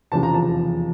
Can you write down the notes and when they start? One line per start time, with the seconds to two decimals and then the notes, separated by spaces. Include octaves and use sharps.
0.12 F1 E2 C#3 F3 A5
0.23 A#5
0.34 A5